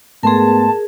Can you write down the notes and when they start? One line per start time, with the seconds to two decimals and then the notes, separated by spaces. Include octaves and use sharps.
0.23 G#2 A3 B3 G#4 A#4 A5 C6